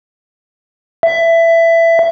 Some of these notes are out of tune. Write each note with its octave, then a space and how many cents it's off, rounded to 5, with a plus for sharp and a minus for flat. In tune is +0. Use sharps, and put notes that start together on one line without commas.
E5 +15